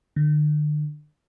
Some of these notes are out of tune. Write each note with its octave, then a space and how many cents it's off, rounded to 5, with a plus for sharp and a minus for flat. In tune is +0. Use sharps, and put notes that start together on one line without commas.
D3 +35